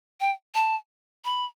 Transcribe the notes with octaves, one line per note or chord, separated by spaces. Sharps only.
G5
A5
B5